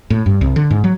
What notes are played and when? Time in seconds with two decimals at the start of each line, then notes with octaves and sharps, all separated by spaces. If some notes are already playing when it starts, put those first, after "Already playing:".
0.10 A2
0.26 G2
0.41 C2
0.56 D3
0.71 G#2
0.84 F#3